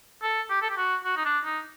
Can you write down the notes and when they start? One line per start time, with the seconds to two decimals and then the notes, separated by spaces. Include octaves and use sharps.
0.23 A4
0.50 G4
0.62 A4
0.70 G4
0.77 F#4
1.04 F#4
1.17 D#4
1.25 D4
1.45 D#4